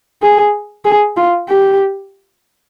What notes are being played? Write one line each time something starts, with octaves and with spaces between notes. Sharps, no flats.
G#4
G#4
F4
G4